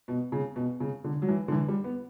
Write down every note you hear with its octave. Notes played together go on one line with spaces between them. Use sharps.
B2
C#3
B2
C#3
D3
F#3
E3
D3
E3
G3
B3